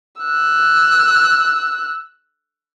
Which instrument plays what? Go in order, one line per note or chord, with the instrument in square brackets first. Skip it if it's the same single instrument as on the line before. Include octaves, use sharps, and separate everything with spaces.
[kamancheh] E6 F#6